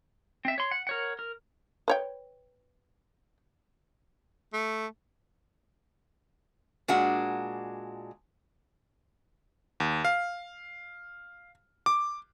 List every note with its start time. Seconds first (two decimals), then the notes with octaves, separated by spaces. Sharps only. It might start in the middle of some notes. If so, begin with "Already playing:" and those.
0.45 C4 E5
0.58 C#5 C6
0.71 F#5
0.87 A#4 C#5 F#5
1.19 A#4
1.88 B4 C#5 G5
4.53 A3
6.88 A#2 G#3 D4 F#4
9.80 D#2
10.05 F5
11.86 D6